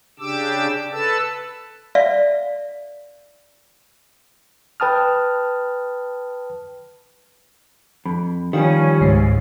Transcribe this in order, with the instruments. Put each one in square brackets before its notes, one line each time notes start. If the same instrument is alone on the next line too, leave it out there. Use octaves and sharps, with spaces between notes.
[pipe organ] C#3 D4 G4 D6 E6
A4 B4 A5 E6
[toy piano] D5 E5 F5
[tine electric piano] B4 G5 A5 D#6 F6
[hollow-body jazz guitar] F2 [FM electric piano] B5
[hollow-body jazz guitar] D#3 F3 G3 [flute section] C#4 [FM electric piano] G4 F5
[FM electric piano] C#2 C#3 C7 [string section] G#2